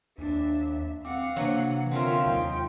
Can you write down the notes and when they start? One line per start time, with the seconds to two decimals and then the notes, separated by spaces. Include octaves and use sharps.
0.18 D#2 D4 E5
1.05 C4 F5 F#5 D6
1.37 C3 E3 F#3 A#3 D4
1.91 D3 C4 C#4 F4 A#4 E5
2.26 D#2 F#3 D#4 G5